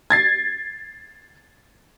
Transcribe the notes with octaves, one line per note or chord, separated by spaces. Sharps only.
G#6 A6 C7